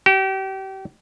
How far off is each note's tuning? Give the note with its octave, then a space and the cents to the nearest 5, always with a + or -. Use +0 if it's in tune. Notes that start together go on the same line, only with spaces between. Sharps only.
G4 -35